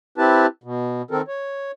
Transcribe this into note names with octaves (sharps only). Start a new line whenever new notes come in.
C4 E4 G4 B4 A5
B2
D#3 C4 A4 A#4
C#5